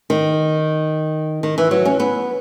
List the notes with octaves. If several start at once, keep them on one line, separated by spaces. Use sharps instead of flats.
D#3
D#3
E3
F#3
C#4
B3